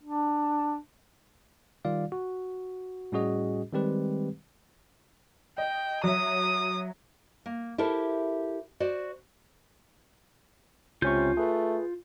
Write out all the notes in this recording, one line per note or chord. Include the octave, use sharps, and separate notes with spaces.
D4
D#3 G3 F4 D5 F5
F#4
A2 G3 C#4 F#4 G#4 D#5
D#3 G3 G#3 C4 G4 B4
D#5 G5
F#3 E5 D#6
A#3
E4 G4 A4 A#4 C5
F#4 C5 D5
C#2 C3 C#4 F4 C#6 G6
A3 G#4 B4